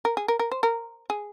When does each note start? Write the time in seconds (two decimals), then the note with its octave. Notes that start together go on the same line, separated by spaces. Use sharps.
0.05 A#4
0.17 G#4
0.28 A#4
0.39 A#4
0.51 C5
0.63 A#4
1.10 G#4